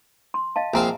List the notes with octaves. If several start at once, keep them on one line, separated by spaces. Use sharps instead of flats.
C6
D#5 F5 A5
A#1 C4 E5 F5 G#5 A#5